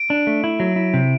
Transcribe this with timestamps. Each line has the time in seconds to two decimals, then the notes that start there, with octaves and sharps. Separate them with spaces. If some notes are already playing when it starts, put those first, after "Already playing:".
Already playing: D7
0.10 D4
0.27 A3
0.44 E4
0.60 F#3
0.76 E4
0.94 C3